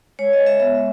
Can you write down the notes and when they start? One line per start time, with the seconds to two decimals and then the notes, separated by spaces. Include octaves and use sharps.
0.19 G#3 C#5
0.33 D#5
0.40 G#3
0.46 E5
0.60 B3 E5